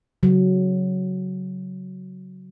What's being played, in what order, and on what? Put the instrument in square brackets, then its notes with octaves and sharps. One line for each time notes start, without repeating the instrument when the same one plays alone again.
[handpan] C#3 F#3